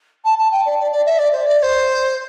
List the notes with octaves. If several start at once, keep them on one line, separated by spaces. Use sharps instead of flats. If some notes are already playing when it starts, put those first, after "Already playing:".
A5
A5
G5
D5
D5
D5
E5
D5
C5
D5
D5
C5